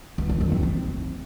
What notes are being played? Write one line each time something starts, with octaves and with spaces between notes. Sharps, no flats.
B3
D#3
D#3
C4
C4